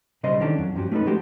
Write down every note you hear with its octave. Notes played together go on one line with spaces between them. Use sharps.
B1 C#3 G3 C5 D#5
D#3 E3 C#4 D4 A4
F2 F#3
G2 F3 C#4 F#4 G4
A3 C#4 D#4 A4 B4
F3 G#3 A3 F#4 G4